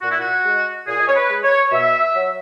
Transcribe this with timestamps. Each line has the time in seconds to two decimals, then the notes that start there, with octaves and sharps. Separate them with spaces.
0.02 A#2 F#4
0.11 E4
0.21 F#4
0.44 G#3
0.87 A#2 G#4
1.00 D#5
1.08 C#5
1.15 B4
1.29 G#3
1.43 C#5
1.71 B2 E5
2.14 F#3